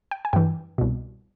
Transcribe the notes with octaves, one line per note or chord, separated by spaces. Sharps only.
G5
G#5
G2 E3 G5
C2 B2